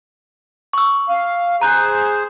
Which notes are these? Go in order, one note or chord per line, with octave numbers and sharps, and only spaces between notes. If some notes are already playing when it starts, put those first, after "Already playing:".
C#6 E6
F5
G#4 C5 A#5 F#6 G6